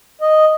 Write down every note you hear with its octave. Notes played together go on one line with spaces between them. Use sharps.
D#5